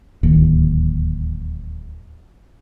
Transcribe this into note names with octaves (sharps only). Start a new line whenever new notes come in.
D1 D#2